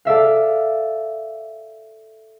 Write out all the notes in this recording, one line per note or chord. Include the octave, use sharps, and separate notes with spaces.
A4 D5 E5 F5